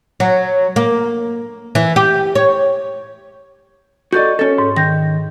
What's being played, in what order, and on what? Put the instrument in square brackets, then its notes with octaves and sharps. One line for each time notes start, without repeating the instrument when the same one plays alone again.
[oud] F#3
A#3
E3
G4
C#5
[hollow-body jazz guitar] F#4 A4 D5 [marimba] D#5 C#6 G6
[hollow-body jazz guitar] C#4 A4
[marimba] G#2
[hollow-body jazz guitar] D#3 [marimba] G6 A#6